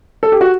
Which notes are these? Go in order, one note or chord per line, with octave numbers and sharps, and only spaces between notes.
A4
G4
F#4